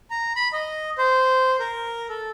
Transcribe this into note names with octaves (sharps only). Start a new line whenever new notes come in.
A#5
B5
D#5
C5
A#4
A4